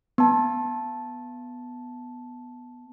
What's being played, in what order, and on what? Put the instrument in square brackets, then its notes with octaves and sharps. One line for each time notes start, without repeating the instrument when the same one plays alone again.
[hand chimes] B3 A5